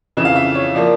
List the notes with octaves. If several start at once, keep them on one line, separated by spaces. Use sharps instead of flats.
F2 C#3 E3
F5
E5
C#5
F3 A#3 D5